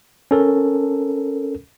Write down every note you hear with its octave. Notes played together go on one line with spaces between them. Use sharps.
C#4 A4 A#4